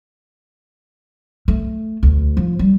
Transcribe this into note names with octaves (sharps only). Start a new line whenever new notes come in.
A3
D2
F3
G3